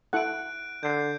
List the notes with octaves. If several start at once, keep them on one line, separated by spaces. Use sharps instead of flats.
E4 A4 F#5 F#6 D7
D3 G6 C7